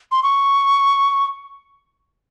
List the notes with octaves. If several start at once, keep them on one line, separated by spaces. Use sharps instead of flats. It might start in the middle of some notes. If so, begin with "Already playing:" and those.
C6
C#6